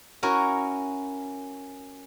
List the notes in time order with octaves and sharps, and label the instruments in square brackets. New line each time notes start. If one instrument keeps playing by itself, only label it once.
[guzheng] C#4 E4 F#4 A#4